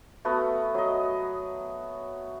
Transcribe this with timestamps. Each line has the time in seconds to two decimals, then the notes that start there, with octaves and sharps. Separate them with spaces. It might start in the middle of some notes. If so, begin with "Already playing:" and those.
0.25 A3 B3 F#4
0.74 F#3 D#5